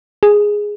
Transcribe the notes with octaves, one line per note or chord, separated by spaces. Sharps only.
G#4